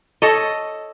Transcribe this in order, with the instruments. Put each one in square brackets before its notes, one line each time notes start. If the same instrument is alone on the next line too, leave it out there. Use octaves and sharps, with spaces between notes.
[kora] A4 C#5 D#5